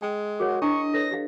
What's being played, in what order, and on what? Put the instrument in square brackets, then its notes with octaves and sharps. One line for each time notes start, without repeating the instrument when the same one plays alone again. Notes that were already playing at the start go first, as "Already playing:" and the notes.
[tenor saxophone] G#3 [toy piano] G5
[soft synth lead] F#4 [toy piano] G#4 A#4 C#5
[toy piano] D4 E4 [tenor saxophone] D#5 [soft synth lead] C#6
[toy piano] A4 B4 C#5 [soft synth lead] A#6
[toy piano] G4 D#5 F5